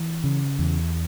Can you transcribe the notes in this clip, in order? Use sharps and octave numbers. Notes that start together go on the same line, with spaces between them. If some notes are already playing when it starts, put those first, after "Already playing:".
Already playing: E3
C#3
E2